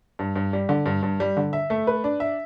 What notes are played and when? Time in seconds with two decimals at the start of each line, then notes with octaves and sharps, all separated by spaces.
0.19 G2
0.36 G2
0.53 G3
0.69 D3
0.86 G2
1.03 G2
1.20 G3
1.37 D3
1.53 E5
1.70 A3
1.87 B4
2.04 D4
2.20 E5